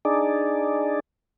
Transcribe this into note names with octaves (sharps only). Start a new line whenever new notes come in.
D4 D#4 G#4 D5